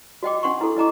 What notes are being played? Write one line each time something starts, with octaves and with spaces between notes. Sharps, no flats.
F#4 D#5 G5 D6
C#4 D4 F#5 C6 C#6
E4 A4
E4 D#5 A#5 D6